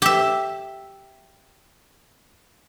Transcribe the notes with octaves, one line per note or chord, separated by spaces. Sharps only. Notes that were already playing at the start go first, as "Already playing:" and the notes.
G4 E5